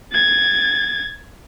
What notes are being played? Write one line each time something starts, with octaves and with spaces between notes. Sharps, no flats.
G#6 A6